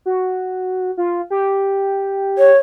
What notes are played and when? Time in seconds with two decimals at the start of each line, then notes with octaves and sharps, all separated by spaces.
0.06 F#4
0.97 F4
1.30 G4
2.38 C#5